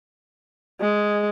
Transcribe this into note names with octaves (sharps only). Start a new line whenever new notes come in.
G#3